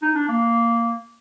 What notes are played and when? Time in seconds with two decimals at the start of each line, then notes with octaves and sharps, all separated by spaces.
0.02 D#4
0.15 D4
0.28 A#3